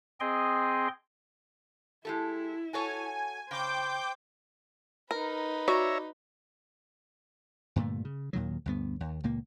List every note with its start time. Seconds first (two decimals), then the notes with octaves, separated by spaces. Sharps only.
0.20 C4 G#4 D#5 G5 C6
2.05 G#3 E4 G4 A4
2.73 F#4 A4 C#5 G#5
3.51 C#3 C5 G5 D6 G6
5.11 D#4 A#4 B4
5.68 F#4 C#5 D5 E5 A#5
7.76 G2 A#2 D3 A3
8.05 C#3
8.33 D#2 A#2 D#3 F#3
8.66 D2 G2 B3
9.00 D#2
9.24 C#2 A#2 A#3